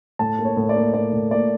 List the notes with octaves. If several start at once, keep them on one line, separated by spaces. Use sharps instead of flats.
A2 A5
A#3
C#5
A2
D5
A#3
A2 D5
A2
A#3 D5